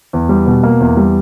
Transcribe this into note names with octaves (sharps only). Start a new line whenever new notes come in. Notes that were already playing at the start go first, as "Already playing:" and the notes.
E2
G3
B2
A#3
E2
G3